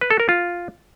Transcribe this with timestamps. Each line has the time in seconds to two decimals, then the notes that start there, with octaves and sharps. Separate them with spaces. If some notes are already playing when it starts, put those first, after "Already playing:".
0.01 B4
0.11 A4
0.20 A#4
0.29 F4